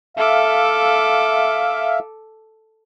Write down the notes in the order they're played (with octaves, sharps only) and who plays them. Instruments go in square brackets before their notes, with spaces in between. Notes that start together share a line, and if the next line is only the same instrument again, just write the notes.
[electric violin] A4 D6 [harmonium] E5 F5